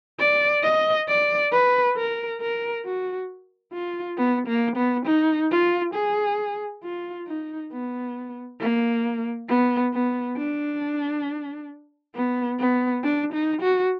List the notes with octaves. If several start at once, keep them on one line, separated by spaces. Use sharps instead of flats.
D5
D#5
D5
B4
A#4
A#4
F#4
F4
B3
A#3
B3
D#4
F4
G#4
F4
D#4
B3
A#3
B3
B3
D4
B3
B3
D4
D#4
F#4